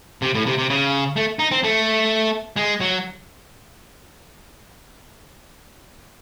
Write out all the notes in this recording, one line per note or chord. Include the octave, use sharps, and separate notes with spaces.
C3
A2
C3
C3
C#3
A3
D#4
C4
A3
G#3
F#3